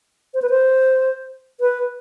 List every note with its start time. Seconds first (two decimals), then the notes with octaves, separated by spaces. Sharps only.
0.34 C5
0.42 B4
0.50 C5
1.60 B4